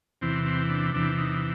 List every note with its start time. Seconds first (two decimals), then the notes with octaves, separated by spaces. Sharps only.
0.21 E2 C3 E3 C4
0.46 C4
0.70 D4
0.94 E2 C3 E3 D4
1.18 D#4